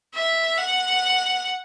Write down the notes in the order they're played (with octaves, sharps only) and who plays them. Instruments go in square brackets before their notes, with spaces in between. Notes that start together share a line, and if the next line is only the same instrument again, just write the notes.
[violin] E5
F#5